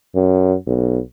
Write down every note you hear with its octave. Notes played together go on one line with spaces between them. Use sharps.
F#2
B1